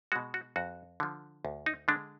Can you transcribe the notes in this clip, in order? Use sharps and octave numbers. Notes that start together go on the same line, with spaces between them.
B2 G#3 F#4
F#4
F2 F#4
D3 F3
D2
D#4
D3 G#3 D4